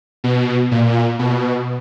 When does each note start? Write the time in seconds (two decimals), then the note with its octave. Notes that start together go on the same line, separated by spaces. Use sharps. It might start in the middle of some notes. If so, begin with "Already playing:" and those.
0.24 B2
0.71 A#2
1.19 B2